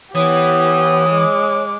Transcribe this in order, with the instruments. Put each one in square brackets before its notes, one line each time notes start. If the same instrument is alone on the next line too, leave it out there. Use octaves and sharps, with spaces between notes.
[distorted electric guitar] E3 [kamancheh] B3 G4 [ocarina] C#5 [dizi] D#6
[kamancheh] G#3 D6